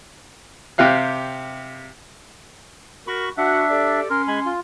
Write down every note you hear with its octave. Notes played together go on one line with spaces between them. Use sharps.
C3 G4 F5 F#6
F#4 A#4 B5 C#6
D4 F#4 E5 F#5
G4 A4 D5
C#4 A#4 C6
G#3 G#5 B5
F4